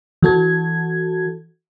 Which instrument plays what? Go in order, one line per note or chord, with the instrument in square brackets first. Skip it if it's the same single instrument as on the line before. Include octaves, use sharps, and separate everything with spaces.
[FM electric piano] E3 F#4 A4 G#6